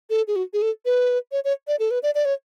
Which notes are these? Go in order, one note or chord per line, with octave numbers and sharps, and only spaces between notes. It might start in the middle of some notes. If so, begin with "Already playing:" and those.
A4
G#4
F#4
G#4
A4
B4
C#5
C#5
D5
A4
B4
D5
D5
C#5